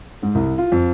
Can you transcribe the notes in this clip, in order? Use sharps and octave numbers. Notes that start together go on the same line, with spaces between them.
G#2
C2
F4
F2